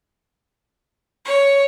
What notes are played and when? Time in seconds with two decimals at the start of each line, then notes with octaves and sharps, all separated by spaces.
1.25 C#5